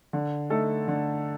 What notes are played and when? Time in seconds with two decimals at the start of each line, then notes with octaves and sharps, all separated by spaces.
0.13 D3
0.50 A3 D#4 A4
0.88 D3